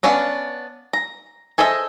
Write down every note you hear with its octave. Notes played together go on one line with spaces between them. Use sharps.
B3 C#4 D4 B4 F5
A#5
G#4 A4 C5 D#5 E5